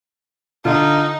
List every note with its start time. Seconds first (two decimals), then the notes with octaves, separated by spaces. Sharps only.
0.65 D3 D#4 F4